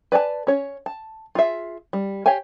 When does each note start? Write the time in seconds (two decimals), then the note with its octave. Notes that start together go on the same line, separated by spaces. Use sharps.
0.12 B4 D5 G#5 A5
0.47 C#4 C#5
0.86 A5
1.35 F4 G#4 E5
1.93 G3
2.26 G4 C#5 F5 G5 G#5